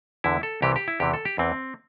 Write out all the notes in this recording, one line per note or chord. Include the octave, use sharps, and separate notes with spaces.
E2 D3 E4
A4
C2 C3 E3 G4
G4
E4
E2 C3 E3 G4
A4
G4
E2 E3 C4